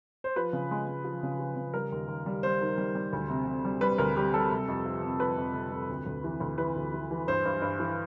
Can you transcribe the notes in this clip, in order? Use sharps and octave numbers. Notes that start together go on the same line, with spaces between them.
C5
F3 B4
C#3
G#3
G#3
F3
C#3
F3
C#3
G3 A#4
D#2
D#2
G3
G3 C5
D#3
G3
G3
D2
C3
C3
G3
G3 B4
D2 A#4
G3 G4
G3 A4
C3
F2
F3
C3
F3 B4
F2
C3
F2
D2
D2
E3
D2
E3 B4
D2
E3
E3
G2 C5
G2
G2
E3